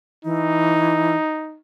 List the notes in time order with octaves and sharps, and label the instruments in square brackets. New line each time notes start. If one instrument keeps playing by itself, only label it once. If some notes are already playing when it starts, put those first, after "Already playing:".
[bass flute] E3 [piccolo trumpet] D#4